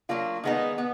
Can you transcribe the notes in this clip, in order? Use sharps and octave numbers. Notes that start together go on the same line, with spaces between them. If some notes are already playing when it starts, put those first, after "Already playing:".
F#3 A#3 D4 F4
D#3 G#3 B3 D#4
B3